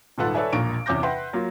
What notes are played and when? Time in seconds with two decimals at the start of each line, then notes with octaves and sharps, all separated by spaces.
0.18 D#1 G#2 F4 A4 B4 F#5
0.34 A4 B4 C#5 D5 E5 G#5
0.53 E1 A#1 A#2 A#4 C#6 D7
0.86 E2 C3 C#4 D6 G6 A#6
1.03 B4 E5 F#5 G5 C6
1.33 F#3 A#3 F4